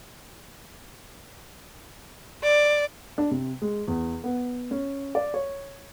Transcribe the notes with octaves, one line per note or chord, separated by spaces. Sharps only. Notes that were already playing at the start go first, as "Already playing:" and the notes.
D5
D4
C3
G#3
E2
B3
C#4
D5
C#5